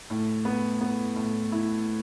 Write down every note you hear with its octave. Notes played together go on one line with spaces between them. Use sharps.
A2
B3
B3
A2
E4